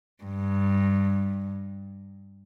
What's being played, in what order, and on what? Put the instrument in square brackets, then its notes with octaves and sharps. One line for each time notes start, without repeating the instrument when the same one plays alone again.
[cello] G2